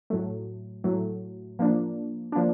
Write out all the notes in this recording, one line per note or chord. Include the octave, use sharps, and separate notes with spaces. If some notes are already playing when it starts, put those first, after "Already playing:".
A2 F#3 A3
A2 F#3 A3
F3 A#3 D4
F3 A#3 D4